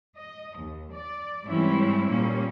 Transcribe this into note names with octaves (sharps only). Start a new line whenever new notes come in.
D#5
D#2
D5
G#2 E3 G3 C4 C#4 E4
A#2 G3 A#3 C#4